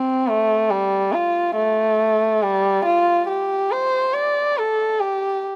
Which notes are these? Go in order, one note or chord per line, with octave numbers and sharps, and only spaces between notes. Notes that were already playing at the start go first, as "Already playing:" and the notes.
Already playing: C4
A3
G3
F4
A3
G3
F4
G4
C5
D5
A4
G4